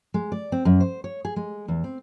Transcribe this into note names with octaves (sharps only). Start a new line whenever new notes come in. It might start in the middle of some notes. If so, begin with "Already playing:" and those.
G#3
D5
C4
F#2
C5
C#5
G#4
G#3
E2
C4